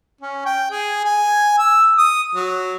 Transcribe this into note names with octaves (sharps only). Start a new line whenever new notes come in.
C#4
G5
G#4
G#5
E6
D#6
F#3